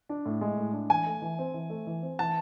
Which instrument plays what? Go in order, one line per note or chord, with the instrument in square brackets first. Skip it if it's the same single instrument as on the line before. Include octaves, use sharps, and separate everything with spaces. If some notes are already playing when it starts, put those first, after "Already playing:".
[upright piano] D4
A2
G#3
A2
D4
[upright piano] E3 [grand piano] G#5
[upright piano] A3
E3
C4
E3
A3
E3
C4
[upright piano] E3 [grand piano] A5